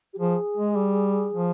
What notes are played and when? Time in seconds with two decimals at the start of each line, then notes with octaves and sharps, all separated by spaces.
0.13 G4
0.19 F3 G#4
0.57 G#3
0.76 G3
1.33 F3